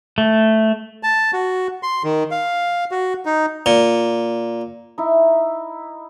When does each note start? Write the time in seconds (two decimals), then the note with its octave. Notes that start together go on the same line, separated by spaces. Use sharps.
0.18 A3
1.03 A5
1.33 F#4
1.83 C6
2.04 D#3
2.31 F5
2.91 F#4
3.25 D#4
3.66 A#2
4.98 D#4 E4